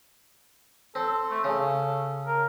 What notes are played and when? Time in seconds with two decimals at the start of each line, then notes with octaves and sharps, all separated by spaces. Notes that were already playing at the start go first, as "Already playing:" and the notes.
0.95 C4 A4
1.31 A3
1.44 C#3 A4
2.27 A#4